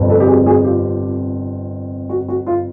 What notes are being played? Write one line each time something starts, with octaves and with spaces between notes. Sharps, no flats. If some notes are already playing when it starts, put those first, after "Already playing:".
Already playing: G1 F2 C3
A4 B4
G4
F#4 G#4
F#4 G#4
F4 G4
F#4
F#4
F4